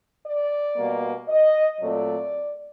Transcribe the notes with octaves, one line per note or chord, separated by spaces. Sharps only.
D5
B2 G3 A#3
D#5
A#2 F#3 A3 C4 D5